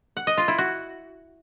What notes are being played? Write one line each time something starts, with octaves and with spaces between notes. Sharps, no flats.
F#5
D#5
F4
E4
F#4